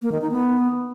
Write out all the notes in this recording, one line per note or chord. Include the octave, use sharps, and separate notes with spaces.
A#3
D#3
D#4
B3